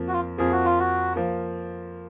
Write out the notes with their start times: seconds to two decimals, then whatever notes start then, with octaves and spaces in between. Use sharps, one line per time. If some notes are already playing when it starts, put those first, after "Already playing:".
Already playing: F2 F3 A#3
0.08 F#4
0.13 F4
0.38 F2 F3 A#3 G#4
0.52 F#4
0.65 F4
0.79 F#4
1.16 F3 A#3